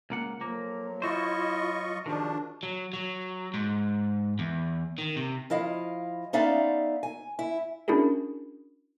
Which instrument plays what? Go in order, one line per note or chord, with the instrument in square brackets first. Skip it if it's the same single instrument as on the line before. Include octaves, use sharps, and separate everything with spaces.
[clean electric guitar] C#2 A#3 F#5
[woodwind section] F2 F3 F#3 [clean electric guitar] A#3
[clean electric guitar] F#3 C5 [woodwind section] E4 [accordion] F4 D#5 C#6
[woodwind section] C#2 C3 F#4 [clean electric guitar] D#3 F3 [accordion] D4
[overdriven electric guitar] F#3
F#3
G#2
E2
D#3
C3
[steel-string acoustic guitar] F3 E4 D#5 F5
B3 C#4 D#4 D5 E5 F5
G#5
E4
[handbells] C#4 D4 E4 F#4 G#4 A#4